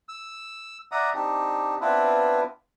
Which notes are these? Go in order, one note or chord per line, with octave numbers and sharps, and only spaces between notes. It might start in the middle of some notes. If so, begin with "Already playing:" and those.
E6
D5 E5 F#5 A#5 D#6
C4 D4 D#4 G4
B3 C4 D4 E4 F4 B4